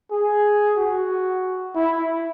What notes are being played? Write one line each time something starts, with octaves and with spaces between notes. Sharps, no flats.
G#4
F#4
E4